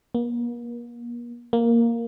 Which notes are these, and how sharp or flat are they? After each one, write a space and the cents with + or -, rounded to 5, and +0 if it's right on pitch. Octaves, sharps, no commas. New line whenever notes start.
A#3 +40
A#3 +0